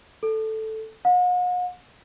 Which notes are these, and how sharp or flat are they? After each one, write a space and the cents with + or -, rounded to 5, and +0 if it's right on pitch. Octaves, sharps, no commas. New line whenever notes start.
A4 +0
F#5 -45